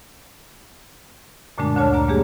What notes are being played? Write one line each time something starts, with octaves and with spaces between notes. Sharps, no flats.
F#2 A#2 D3 G#3 A3 D4
D2 D3 D4 C#5 A5 F6
D4 D5 A#5
G3 G#3 A#3 D4 G4 G#4